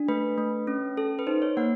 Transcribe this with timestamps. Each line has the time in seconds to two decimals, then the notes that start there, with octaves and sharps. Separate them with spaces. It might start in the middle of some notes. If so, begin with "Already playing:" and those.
Already playing: D4
0.08 A3 B4
0.38 A3
0.67 C#4
0.97 A4
1.19 B4
1.27 D#4 C5
1.42 C#5
1.57 A#3 F#5